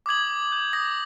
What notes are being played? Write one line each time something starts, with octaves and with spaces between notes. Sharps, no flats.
D6 D#6 G#6 F#7
G6
D#6 A#6